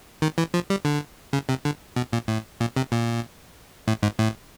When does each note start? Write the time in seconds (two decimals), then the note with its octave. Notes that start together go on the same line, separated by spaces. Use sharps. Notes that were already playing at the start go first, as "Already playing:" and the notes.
0.22 D#3
0.38 E3
0.54 F3
0.70 G3
0.85 D3
1.33 C#3
1.49 C3
1.65 D3
1.96 B2
2.13 A#2
2.28 A2
2.61 A#2
2.76 C3
2.92 A#2
3.88 A2
4.03 G#2
4.19 A2